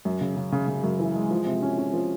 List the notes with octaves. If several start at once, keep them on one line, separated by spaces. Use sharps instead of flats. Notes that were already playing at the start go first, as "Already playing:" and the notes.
F#2
C#3
C#3
C#3
C#3
F#2
E3
G#3
F3
C3
C#4
C#4
F3